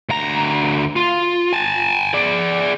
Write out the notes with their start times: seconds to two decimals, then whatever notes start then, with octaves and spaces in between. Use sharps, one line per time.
0.09 D2 A#5
0.96 F4
1.53 G#5 A5
2.13 G#4 D5